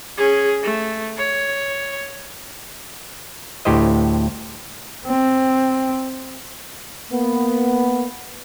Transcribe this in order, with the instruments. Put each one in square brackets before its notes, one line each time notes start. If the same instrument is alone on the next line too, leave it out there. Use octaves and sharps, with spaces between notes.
[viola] C#4 G#4
A3
C#5
[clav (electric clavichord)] D2 A2 G4 C5 D#5
[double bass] C4
[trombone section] A#3 B3